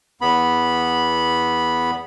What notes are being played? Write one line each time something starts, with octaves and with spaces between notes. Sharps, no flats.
E2 B3 B5